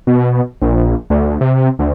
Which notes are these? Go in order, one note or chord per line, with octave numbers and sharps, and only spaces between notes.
B2
A#1
D2
C3
D2